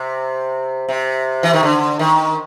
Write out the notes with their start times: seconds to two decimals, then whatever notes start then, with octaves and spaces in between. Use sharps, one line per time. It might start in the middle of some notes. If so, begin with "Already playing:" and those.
Already playing: C3
0.89 C3
1.43 E3
1.53 D#3
1.63 D3
1.99 D#3